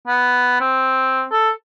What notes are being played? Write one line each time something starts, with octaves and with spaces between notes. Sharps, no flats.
B3
C4
A4